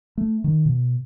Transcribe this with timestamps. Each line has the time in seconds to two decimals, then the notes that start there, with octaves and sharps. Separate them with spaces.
0.18 A3
0.44 D#3
0.65 B2